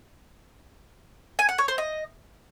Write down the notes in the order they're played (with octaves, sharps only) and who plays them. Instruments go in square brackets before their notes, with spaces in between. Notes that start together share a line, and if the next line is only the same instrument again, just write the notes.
[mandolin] G#5
F#5
C#5
C5
D#5